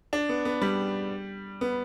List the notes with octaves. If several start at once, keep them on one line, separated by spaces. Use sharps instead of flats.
D4
B3
B3
G3
B3